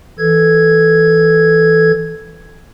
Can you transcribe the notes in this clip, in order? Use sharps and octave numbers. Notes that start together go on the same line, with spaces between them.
E3 A4 G#6